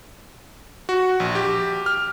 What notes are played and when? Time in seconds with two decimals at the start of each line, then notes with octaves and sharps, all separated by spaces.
0.89 F#4
1.20 A#1
1.35 G4
1.86 F6